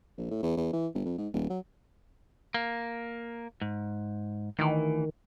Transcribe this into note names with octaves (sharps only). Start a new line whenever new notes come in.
A#1
A2
E2
E2
E3
G1
F2
G#2
D#1
F#3
A#3
G#2
D2 D#3 E3